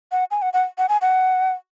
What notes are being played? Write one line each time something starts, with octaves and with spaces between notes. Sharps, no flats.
F#5
G#5
F#5
F#5
F#5
G#5
F#5